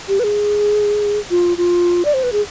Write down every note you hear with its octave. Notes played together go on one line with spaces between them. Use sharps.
G4
B4
G#4
F4
F4
D5
C5
B4
G#4